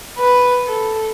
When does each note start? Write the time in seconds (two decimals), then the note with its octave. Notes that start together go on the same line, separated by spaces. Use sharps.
0.18 B4
0.67 A4